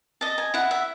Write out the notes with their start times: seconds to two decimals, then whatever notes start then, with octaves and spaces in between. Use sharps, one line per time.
0.21 D#5 A5
0.38 G#5
0.54 E4 F#5
0.71 E5